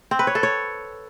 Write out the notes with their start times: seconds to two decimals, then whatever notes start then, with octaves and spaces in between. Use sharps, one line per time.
0.11 C4
0.19 B4
0.27 C#5
0.35 A4
0.43 C#5